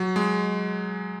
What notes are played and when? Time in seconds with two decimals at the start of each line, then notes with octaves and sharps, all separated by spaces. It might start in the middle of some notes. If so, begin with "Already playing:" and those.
Already playing: F#3
0.16 G#3